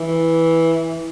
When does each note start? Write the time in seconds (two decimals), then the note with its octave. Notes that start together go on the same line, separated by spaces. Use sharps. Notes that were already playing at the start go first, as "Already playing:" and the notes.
Already playing: E3